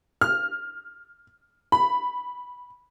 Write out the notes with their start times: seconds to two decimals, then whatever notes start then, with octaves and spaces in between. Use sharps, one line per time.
0.21 F6
1.72 B5